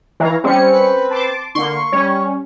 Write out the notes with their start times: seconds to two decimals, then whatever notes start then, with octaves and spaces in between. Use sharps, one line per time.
0.20 E3 C#5 F5 A#5
0.44 G3 C4 C#4 C#7
0.72 B4
1.11 A5 C6 D6
1.55 D3 A#3 C6 C#6
1.92 G3 C#4 C#5